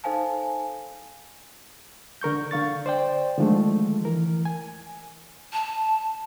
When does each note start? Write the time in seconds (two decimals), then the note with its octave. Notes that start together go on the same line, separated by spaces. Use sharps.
0.04 D#4 A4 C5 F5 G#5 A5
2.22 D3 A#4 C#6 G6
2.51 D3 F5 C#6 A6
2.86 C5 D5 G5
3.38 D3 D#3 F3 G#3 A3
4.05 E3 A#4
4.45 G#5
5.53 A5